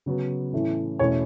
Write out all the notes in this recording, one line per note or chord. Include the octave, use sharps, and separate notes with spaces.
C#3 F#3 B3
A2 E3 A3 C#4
E2 B2 A3 C#4 C#5